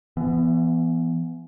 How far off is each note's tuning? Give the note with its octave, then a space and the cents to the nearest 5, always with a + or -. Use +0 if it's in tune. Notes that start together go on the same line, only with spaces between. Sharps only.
E3 +35 B3 +0